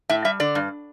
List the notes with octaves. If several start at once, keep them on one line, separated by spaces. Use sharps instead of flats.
A2 E5
G3 E5
D3 D5
G2